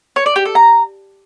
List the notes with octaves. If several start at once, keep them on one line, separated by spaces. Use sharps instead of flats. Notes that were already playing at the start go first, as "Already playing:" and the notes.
C#5
D5
G4
A4
A#5